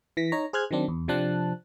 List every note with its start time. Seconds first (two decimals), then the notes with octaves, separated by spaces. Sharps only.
0.17 E3 A#6 B6
0.32 D#4 C#5 A#5
0.53 G#4 C5 F6 F#6 G#6
0.71 D#3 F#3 C4 D4
0.88 E2
1.08 C3 F3 C4 D4 A5 F#6